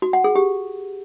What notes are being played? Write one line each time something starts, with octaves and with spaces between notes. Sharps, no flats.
F#4
F#5
G#4
G4